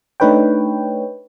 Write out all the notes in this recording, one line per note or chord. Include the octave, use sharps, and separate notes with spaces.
A3 D4 D#4 B4 C#5 G5